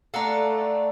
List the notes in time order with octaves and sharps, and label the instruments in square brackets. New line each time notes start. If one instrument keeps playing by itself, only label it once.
[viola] A3 [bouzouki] D4 A4 [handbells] F5 F#5 A#5